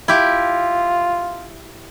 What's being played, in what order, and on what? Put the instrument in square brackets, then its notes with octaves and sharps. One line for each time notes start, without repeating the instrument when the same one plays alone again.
[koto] E4 G4 [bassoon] F4